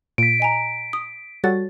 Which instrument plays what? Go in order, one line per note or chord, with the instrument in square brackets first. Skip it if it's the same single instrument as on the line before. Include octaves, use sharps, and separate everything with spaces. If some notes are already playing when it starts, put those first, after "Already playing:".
[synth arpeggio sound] A#2 [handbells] B6 D7
[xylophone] D#5 G#5 A#5
D#6
[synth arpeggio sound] G3 F#4 A4 [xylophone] C#5 A6